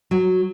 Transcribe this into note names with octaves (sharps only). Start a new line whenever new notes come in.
F#3